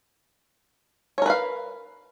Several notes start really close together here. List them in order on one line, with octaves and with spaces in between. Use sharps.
C#5 A#4 B4 F5